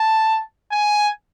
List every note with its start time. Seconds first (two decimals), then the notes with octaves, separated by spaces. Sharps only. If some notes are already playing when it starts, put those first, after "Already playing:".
Already playing: A5
0.72 G#5